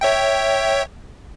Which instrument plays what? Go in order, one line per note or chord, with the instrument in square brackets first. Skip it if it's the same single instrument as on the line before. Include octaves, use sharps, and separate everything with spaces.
[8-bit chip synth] C#5 E5 G5